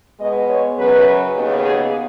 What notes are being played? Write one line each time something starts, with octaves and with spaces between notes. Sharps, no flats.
B2 G#3 B3 D#5
C#5
F#2 C#3 F#3 B4
D#2 C#3 B3
G#4